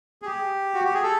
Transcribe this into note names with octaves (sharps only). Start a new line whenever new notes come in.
G#4
G4
F#4
G4
G#4
A4